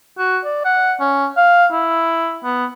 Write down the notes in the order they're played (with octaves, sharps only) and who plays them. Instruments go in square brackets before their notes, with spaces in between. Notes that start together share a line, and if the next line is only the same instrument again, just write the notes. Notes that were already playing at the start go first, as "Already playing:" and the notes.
[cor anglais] F#4
D5
F#5
C#4
F5
E4
B3